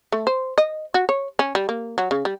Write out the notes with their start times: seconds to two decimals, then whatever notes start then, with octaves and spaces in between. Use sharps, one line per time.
0.12 A3
0.27 C5
0.58 D#5
0.94 F#4
1.09 C#5
1.39 C#4
1.55 G3
1.69 A#3
1.98 F#3
2.11 C#3
2.25 G3